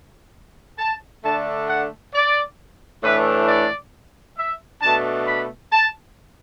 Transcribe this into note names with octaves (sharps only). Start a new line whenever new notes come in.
A5
D3 A3 D4 A5
F#5
D5
A2 E3 A3 D4 B4
D5
E5
B2 A3 D4 A5
B5
A5